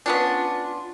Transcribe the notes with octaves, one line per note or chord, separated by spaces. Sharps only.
B3 C#4 D4 F4